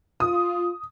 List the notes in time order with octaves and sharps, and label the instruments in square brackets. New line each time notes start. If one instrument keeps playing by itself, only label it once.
[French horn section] F4 [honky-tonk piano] D#6